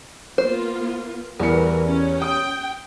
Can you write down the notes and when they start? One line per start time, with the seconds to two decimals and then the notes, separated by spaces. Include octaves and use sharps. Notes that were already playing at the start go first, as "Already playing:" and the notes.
0.38 A#3 B3 F4 C5
1.39 E2 E3 G3 A#4 C#7
1.85 C#4
2.22 G5 D#6